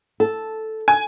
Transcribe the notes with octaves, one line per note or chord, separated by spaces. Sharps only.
A4
G#5